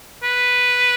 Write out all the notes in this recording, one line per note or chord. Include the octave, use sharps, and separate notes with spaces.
B4